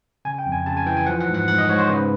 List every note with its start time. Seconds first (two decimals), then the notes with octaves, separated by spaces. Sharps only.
0.25 C#3 G#5
0.39 G5
0.46 F2
0.52 G#5
0.66 C#3 A5
0.77 G#5
0.86 E3 G5
0.97 G#5
1.07 F3 F#5
1.20 F#5
1.28 G#2
1.34 F#5
1.48 G#2 F#5
1.58 D#5
1.68 G#2 C#5
1.79 C5
1.89 C#3 B4